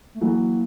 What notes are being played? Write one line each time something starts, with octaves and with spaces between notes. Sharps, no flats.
A3
E3 F#3 A#3